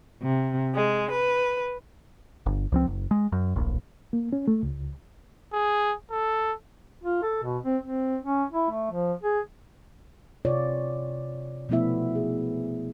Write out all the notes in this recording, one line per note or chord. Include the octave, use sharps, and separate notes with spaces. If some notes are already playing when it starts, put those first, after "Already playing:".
C3
G#3
B4
G1
C#2 F3 C4
F#1
G#3
F#2
D1 A#1
A#3
C#4
A3
C#2
G#4
A4
F4
A4
B2
C4
C4
C#4
E4
A3
F3
G#4
C3 F4 C#5 D5
B2 F3 A3 B3 E4 E5
G#4